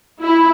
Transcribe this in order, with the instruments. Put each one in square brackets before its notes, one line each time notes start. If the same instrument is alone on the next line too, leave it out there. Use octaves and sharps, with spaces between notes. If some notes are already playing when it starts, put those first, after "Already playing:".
[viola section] E4